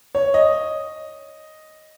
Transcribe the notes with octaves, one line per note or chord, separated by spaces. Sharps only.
C#5
D#5